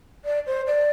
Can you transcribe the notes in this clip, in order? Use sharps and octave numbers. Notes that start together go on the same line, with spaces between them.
D5
C5
D5